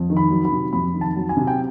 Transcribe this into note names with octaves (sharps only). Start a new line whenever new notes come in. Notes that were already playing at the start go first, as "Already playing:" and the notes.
Already playing: F2
D#3
B5
F#3
B5
C3
F2 B5
D#3
A5
F#3
G#5
C3
G5